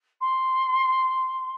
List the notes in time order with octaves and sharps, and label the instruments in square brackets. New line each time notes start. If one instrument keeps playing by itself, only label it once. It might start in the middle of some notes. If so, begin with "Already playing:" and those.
[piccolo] C6